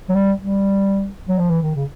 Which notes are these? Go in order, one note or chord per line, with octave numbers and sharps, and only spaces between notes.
F#3
G3
G3
F#3
F3
E3
D#3
C#3